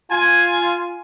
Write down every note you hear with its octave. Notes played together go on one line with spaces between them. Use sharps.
F4 G#5